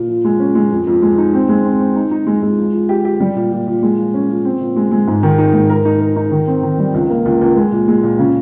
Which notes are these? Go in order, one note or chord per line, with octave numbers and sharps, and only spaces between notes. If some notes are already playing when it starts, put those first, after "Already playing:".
Already playing: A#2
F3
G#3
C#4
G#3
F2
F2
G#3
D#4
C4
G#3
C4
C4
D#4
D#4
G#3
G#3
F3
F3
G4
G4
G3
A#2
A#2
A#2
G#3
F3
C#4
F3
C4
A#2
G#3
G#3
G#2
D#3
D#4
G#2
A#4
D#4
A#4
D#4
D#3
C4
D#3
G3
C#2
A#3
C#2
C#2
G#3
A#2
G#3
A#2
C#3